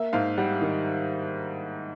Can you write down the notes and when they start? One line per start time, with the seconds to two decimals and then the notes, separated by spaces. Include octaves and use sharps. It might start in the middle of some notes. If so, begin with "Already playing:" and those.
Already playing: A#3 E5
0.13 G#2 F5
0.38 G3 F#5
0.61 D#3